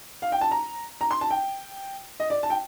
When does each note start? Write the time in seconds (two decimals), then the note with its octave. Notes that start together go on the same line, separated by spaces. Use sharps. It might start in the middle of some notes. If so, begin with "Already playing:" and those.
0.22 F5
0.32 G5
0.41 A5
0.51 A#5
1.01 A#5
1.11 C6
1.21 A5
1.31 G5
2.20 D#5
2.30 D5
2.43 A5
2.50 G5